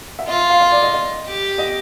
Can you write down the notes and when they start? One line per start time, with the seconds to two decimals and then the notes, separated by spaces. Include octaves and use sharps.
0.19 E5
0.27 F4 D#5
0.50 F5
0.61 D#5
0.72 D5
0.82 D#5
0.94 D#5
1.27 G4
1.58 D#5